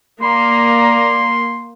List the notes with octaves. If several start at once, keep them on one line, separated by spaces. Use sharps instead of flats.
A#3 D5 A#5 C6